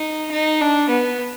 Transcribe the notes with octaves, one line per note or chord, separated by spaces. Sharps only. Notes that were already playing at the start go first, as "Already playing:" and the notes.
Already playing: D#4
D#4
D4
B3